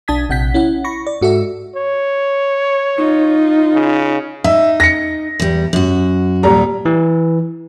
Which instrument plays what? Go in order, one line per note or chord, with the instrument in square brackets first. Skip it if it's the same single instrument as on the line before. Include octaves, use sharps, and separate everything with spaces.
[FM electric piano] B1 D4 A5 D#6 G#6 B6
A#1 C3 F#5 G6 B6
C#4 E4 F#5
B5 C#6 A#6
D5
G#2 F#4 A4 E5
[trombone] C#5
[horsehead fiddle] D#4 F4
[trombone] C#3
[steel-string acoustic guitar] D#4 [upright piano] E5
[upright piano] A#6 C#7
[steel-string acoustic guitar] E2 G3
F#2 F#4
[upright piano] D#1 G3 A#5
[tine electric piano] E3